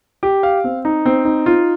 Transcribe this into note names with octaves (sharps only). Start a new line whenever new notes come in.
G4
F5
C4
D#4
C4
D#4
F4